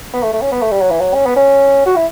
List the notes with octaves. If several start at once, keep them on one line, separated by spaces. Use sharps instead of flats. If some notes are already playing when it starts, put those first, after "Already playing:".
B3
A3
A3
C#4
B3
A3
G3
F#3
E3
F#3
C#4
B3
C#4
F#4
E4